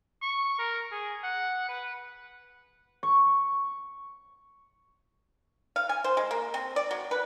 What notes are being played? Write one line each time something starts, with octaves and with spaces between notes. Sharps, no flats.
C#6
A#4
G#4
F#5
B4
C#6
F5
G#5
C5
G#3
A#3
C4
D5
F#3
B4